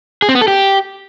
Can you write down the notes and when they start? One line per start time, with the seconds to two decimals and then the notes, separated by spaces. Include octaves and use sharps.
0.22 G#4
0.29 C4
0.35 B3
0.41 A4
0.48 G4